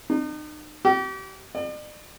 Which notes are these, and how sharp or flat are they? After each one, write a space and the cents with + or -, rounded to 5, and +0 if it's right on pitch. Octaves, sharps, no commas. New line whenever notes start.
D#4 -40
G4 -35
D5 +45